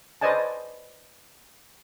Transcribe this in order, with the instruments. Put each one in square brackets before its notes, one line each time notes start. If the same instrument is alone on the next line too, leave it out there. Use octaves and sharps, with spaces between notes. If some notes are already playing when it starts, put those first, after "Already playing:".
[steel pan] B4 C5 D5 D#5 G#5 A5